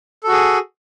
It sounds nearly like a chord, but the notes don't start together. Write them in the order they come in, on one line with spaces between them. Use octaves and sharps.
A4 F#4 G#4